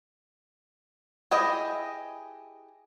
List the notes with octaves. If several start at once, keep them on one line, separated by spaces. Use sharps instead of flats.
E4 G4 G#4 B4 D#5